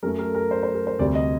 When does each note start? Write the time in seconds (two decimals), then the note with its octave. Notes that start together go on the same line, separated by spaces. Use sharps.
0.03 F#2 F#3 A3 A#4
0.19 A#4
0.29 A4
0.35 A#4
0.51 C5
0.63 C5
0.75 A#4
0.87 C5
0.99 D2 C3 G3 D5
1.15 D#5